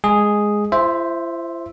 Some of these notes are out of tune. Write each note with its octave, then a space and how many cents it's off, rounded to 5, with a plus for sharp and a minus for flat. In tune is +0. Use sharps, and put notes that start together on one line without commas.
G#3 +0 G#4 +0
E4 +45 C5 +0 E5 +0